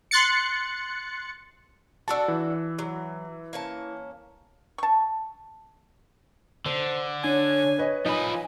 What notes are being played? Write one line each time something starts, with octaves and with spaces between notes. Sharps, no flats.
C6 F#6 A6 C#7
D4 F#4 A4 A5 E6
E3
F#3
A#3 C#4 A5
A5 C#6
D3 C5
D4 C#5 G#5
B4 C#5 D#5
F3 D#4 G#5 B5